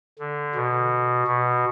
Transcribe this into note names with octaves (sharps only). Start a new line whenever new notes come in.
D3
B2
B2